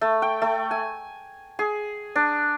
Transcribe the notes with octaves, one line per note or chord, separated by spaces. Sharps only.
A3
G5
A3
G#5
G#4
D4